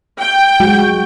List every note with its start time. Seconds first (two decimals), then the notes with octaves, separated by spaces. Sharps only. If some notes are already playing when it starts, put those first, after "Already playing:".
0.20 G5
0.60 F#3 G#3 F#4